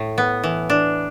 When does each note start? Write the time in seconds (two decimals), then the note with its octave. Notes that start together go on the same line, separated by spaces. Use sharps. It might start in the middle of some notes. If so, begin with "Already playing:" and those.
Already playing: A2
0.18 B3
0.44 E3
0.70 D4